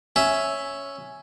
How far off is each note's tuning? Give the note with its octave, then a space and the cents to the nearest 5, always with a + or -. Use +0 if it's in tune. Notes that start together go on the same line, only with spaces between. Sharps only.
C#4 +0 E5 +0